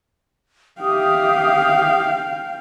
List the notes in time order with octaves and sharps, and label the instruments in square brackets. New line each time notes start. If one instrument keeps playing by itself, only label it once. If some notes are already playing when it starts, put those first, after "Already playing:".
[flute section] G4 E5 D#6 [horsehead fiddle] F5 G5